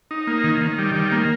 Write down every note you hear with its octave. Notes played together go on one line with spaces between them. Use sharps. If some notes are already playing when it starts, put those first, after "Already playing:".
D#4
A#3
D#3
D#3
G3
D#3
A#3